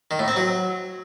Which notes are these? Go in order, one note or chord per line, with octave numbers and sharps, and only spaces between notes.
D#3
A2
C4
F#3